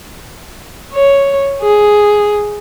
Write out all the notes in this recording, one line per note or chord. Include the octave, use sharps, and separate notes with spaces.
C#5
G#4